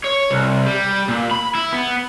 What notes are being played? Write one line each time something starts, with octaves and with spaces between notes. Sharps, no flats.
C#5
C2
G3
A#2
B5
E4
B3